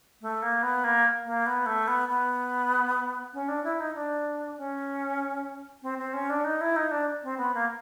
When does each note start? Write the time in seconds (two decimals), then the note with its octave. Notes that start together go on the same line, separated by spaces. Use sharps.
0.21 A3
0.42 A#3
0.63 B3
0.84 A#3
1.25 A#3
1.46 B3
1.66 A3
1.88 B3
2.09 B3
3.34 C#4
3.48 D4
3.64 E4
3.80 D#4
3.95 D4
4.57 C#4
5.82 C4
5.98 C4
6.14 C#4
6.30 D4
6.45 D#4
6.61 E4
6.76 D#4
6.91 D4
7.23 C4
7.38 B3
7.54 A#3